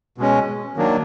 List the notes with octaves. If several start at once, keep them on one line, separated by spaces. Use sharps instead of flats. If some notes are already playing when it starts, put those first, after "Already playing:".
B2 G#3 C#4
D#3 F#3 A#3 D4